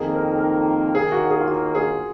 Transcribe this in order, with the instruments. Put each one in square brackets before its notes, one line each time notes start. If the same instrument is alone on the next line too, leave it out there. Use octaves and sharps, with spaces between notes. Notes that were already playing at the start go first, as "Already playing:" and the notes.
Already playing: [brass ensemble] F2 D#3 A#3 [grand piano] G#4
[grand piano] A#4
A#4
[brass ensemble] D#2 D#3 A#3 [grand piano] G#4
[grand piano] F#4
G#4
F4
F#4
G#4